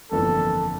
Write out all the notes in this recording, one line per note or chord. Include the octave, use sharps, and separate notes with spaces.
G1 F2 E3 A#3 A4